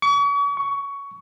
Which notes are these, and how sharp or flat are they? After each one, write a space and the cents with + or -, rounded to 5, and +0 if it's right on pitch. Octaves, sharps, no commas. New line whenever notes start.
C#6 +40
C#6 +15